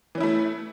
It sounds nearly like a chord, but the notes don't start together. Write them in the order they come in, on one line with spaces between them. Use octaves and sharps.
E3 C#4 E4 A3